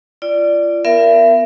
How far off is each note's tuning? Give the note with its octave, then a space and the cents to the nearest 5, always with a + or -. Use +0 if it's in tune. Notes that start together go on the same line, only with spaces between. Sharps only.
F4 -35 D5 +0
B3 +10 A#4 +0 E5 +35